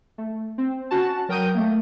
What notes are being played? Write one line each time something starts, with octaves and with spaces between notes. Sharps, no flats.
A3
C4
C#4 F#4 A5
F#3 A#4 G5 D#6 G6 D#7
A3 A#3